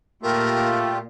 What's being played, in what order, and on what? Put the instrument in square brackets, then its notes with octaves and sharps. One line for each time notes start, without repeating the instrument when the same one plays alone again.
[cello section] A#2 [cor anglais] A3 [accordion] F4 G4 [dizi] A#4